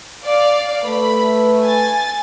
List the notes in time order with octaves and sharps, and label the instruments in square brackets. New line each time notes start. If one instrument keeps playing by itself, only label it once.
[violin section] D5 F5
[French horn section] A3 B4 [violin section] B5
[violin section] G#5 A6